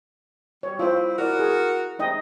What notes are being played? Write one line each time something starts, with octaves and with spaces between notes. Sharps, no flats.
G3 C#5
G3 C4 E4 F4 C5
E4 F#4 A#4 D5
G#4
C3 D#4 D#5 G5